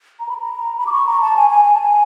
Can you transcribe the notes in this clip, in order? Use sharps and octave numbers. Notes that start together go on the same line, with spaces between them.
A#5
B5
A#5
B5
D6
C#6
A#5
A5
G#5
G#5
G#5
A5
G#5